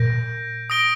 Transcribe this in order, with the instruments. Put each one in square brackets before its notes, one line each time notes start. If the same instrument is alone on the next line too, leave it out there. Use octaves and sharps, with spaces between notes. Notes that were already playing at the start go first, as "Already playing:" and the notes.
Already playing: [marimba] A#2 [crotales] G6 A#6 D7
[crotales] D#6 A#6 D7 G7